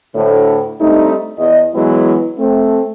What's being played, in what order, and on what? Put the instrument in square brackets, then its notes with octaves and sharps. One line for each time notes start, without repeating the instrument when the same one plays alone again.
[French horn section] D2 A2 D3
G3 A3 C4 D4 D#4
E2 D#5
E3 F#3 G#3 B3 E4
A3 C4